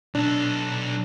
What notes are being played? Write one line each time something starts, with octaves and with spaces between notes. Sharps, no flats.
B1 D4 A4